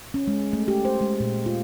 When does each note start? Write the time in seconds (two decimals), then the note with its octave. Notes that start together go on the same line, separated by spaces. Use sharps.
0.14 C#4
0.28 G#3
0.53 A3
0.68 G4
0.85 C5
1.01 G#3
1.20 A#2
1.46 F4